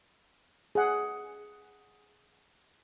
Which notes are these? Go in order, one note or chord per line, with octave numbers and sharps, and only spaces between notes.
G#4 F#5